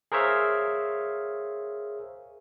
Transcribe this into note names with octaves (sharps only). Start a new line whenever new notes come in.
G#4 A#4 C5 C#5 E5 F5